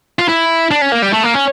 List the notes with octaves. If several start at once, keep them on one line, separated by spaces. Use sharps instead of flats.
F4
E4
D4
C#4
A#3
G3
A3
A#3
C#4